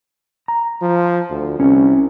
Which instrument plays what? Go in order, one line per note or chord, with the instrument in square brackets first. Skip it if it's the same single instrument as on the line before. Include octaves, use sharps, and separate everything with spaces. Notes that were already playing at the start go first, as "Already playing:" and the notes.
[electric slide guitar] A#5
[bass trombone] F3
D2
[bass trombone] C2 [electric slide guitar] C#4